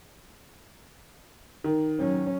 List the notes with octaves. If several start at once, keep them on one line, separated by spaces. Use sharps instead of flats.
D#3
F#3 C#4